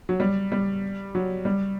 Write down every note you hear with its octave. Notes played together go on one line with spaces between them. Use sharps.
F#3
G3
G3
F#3
G3